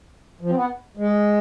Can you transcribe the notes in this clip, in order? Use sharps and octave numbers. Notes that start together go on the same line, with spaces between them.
F3
C4
B3
G#3